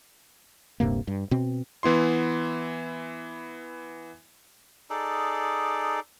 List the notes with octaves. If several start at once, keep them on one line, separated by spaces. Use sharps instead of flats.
D#1 G2 C3 A#3
G2
B2 C4
E3 B3 E4 C6
D#4 G#4 A4 D5